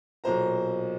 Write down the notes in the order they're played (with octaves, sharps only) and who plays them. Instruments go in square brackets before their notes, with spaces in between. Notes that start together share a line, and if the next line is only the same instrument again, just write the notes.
[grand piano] B1 A#2 C5 A#5